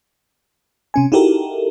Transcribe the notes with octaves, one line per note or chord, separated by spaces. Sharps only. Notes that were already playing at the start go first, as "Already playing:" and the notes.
C3 C#4 G#5
D#4 E4 F#4 G4 A4 A#4